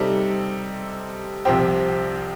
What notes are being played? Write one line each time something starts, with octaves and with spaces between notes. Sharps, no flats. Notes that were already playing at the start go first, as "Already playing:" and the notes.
Already playing: C3 G3 C4 D#4 A4
C2 C3 F3 C4 G4